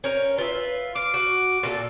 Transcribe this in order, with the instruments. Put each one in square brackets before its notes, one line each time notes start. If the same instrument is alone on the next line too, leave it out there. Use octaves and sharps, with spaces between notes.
[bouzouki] C#4 A#4 [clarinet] C5
[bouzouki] F4 E5 [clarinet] B4
[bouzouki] F5 [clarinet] D6
[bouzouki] F#4
A#2 F4 A4